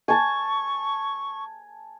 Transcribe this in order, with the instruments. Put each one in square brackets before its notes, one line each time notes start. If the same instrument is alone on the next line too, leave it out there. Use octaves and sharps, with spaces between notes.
[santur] G#5 A5 [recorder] C#6